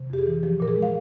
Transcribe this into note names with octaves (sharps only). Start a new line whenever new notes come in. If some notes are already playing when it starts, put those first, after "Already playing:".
Already playing: C3
F2 G4
G#4
E3
F3 G4
A#2 A#4
G#4
G#3
F5